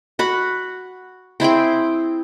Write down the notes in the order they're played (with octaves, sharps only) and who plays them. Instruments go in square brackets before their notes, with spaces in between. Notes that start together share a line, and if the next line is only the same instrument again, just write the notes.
[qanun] F#4 F#5 B5
C4 E4 G#4 G5